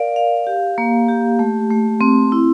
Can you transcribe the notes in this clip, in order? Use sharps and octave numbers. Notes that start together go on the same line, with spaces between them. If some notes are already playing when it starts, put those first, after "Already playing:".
Already playing: A#4 D5 F5
F5
G4
A#3
G4
A3
A3
C4
E4